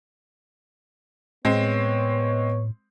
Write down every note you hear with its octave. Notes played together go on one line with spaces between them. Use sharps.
A2 G#3 B3 C4 C#5